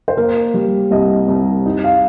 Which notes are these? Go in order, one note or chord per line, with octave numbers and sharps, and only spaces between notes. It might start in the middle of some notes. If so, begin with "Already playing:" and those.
C5
A#3 A#4
G3
C2 D#5
C2
D#4
F5